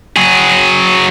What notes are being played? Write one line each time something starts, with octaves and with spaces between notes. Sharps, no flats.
F#3 G#4